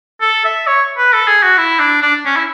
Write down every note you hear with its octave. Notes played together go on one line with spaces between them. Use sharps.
A4
E5
C#5
B4
A4
G#4
F#4
E4
D4
D4
C#4
E4